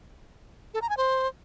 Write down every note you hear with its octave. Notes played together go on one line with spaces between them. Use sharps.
A4
A#5
G#5
C5